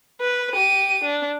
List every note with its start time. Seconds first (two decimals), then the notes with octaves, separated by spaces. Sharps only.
0.21 B4
0.53 G4 D#7
1.04 D4